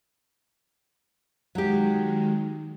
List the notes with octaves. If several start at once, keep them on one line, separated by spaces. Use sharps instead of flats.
D#3 F#3 G#3 G4